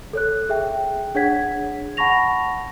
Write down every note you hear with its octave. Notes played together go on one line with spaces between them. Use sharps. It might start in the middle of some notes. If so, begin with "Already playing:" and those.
A4 C#5 F#6
G#4 E5 G5
D4 G#4 C#5 F#5 G#6 B6
F#5 A5 B5 C#6 A#6 F7